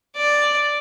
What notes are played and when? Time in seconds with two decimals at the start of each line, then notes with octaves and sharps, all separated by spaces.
0.17 D5